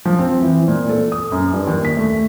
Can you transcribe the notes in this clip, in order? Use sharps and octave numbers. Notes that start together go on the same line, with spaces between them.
F3
C4
E3
A#2
A4
D#6
F#2
G2
D#2
B6
A3